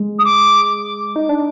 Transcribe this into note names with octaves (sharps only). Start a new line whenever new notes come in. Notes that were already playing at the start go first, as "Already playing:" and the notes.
Already playing: G#3
D#6
D6
D#4
D4